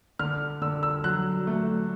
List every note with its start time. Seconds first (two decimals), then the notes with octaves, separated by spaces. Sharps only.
0.19 D3 F6
0.62 D3 E6
0.83 E6
1.04 F#3 F#6
1.47 A3